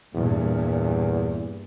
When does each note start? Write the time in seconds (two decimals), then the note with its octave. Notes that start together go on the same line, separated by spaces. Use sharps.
0.15 E2 G2 A#2